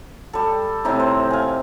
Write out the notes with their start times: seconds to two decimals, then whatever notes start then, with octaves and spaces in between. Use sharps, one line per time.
0.33 G3 A4
0.85 A2 C3 D#4
1.00 C5
1.30 F5 G#5